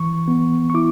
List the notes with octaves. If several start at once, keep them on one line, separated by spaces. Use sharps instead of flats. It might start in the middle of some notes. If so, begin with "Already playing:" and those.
Already playing: E3 C#6
B3
C#6
E4 D6